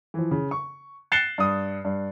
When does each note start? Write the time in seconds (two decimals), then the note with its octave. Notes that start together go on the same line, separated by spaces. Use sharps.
0.14 E3 F3
0.31 C#3
0.51 C#6
1.12 F#6 A6 C7 C#7 E7 G7
1.38 G2 D#6
1.85 G2